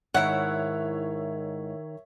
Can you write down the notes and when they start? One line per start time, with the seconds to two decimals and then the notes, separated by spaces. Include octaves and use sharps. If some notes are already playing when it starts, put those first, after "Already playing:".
0.14 G#2 D#3 E4 C#5 E5 F#5